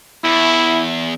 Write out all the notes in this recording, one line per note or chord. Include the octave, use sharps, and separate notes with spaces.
E2 E4